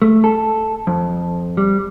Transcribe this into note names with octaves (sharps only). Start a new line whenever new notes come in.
A3
A4
F2
G3